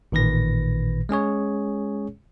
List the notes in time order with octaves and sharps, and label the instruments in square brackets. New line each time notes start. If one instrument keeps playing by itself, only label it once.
[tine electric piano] A1 A#2 D#3 B4 A#6
G#3 C#4 G#4 C#5